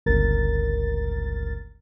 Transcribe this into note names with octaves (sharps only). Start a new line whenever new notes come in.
G1 C#2 A#4 A6